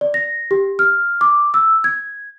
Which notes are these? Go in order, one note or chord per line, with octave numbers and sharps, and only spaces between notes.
D5
A#6
G4
F6
D6
E6
G#6